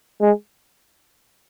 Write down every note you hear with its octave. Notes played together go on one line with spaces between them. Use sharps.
G#3